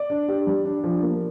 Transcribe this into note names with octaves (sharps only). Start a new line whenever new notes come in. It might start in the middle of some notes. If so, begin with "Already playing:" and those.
Already playing: D5
D4
G4
G3
D4
F3
A#3